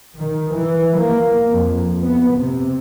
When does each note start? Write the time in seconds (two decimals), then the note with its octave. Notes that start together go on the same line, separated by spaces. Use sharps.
0.16 D#3
0.51 E3
0.96 A#3
1.51 F2
2.05 B3
2.38 C3